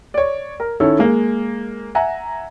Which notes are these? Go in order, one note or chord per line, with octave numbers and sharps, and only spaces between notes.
C#5 D5
A#4
D#3 C#4 E4 A4
G#3 A#3
E5 F#5 G#5 A#5